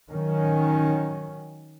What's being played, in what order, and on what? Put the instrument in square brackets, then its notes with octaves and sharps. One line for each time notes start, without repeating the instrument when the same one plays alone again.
[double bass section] D#3 F#3 C#4